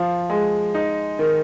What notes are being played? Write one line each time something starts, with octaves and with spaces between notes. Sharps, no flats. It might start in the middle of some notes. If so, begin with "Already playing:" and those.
Already playing: F3
G#3
D#4
D#3